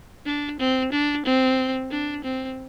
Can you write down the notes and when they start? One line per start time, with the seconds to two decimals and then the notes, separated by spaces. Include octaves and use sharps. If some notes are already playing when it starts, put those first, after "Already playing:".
0.26 D4
0.60 C4
0.92 D4
1.25 C4
1.91 D4
2.24 C4